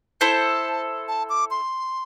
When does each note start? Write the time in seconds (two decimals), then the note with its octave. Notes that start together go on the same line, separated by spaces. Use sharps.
0.21 E4 A4 C5 A5
1.08 A5
1.30 D6
1.51 C6